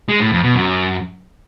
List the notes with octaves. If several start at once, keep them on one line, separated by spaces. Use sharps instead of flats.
G#3
A2
F2
B2
F#2